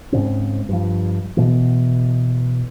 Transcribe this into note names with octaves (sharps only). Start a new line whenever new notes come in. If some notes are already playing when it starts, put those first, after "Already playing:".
G#2 C#3 C4
G2 F3
B2 E3